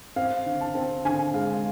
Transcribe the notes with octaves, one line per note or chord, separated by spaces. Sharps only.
C4 F5
D3
A5
C4
D3 G#5
G#3 F5